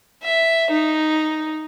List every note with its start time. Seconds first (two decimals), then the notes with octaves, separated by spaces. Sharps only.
0.24 E5
0.71 D#4